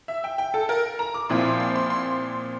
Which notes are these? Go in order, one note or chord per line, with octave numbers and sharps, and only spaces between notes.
E5
G5
G5
A4
A#4
A#5
D6
A#2 F3 C4 E4 C6
D6
C6
C6
C6
C6